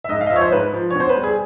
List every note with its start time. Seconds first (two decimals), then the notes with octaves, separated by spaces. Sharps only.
0.04 E5
0.09 G#2 D#5
0.21 F5
0.26 D#5
0.30 F3 E5
0.36 C#5
0.41 C5
0.52 G#2 B4
0.73 F3
0.90 C#5
0.95 B2 C5
1.09 B4
1.16 G3
1.23 G#4